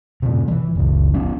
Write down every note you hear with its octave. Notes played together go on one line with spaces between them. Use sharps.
A2 C3
E3 G3
F#1 C#2
F#3 B3 C#4